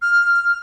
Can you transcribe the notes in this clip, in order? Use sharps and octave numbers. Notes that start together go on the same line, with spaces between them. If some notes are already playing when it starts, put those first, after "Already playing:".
F6